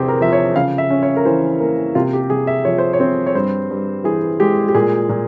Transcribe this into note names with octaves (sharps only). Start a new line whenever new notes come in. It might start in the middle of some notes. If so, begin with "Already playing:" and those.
Already playing: E2 C3 C4 G4 G#4
A#4
F3 E5
C#5
C#3 F5
E5
C#4
C#5
A#4
E3 C5
A#3
C3 F4
G4
C3 G#4
E5
F3 C#5
C5
C#5
C4
C#5
G2 C5
G2
E3 G#4
G#3 G4
G4
A#2 G#4
A#2